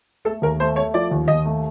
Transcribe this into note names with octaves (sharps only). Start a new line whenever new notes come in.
A3 A4
D#2 A#4
A3 C5
A3 C#5
F3 D5
D#2
D#2 D#5
A3